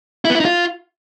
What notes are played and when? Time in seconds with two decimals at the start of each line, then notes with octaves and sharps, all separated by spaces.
0.25 E4
0.30 B3
0.35 E4
0.40 D#4
0.45 F4